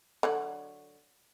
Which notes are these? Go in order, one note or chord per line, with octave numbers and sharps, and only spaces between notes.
D3 F#3 F#4